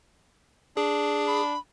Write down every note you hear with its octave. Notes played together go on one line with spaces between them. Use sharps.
D4 G#4
B5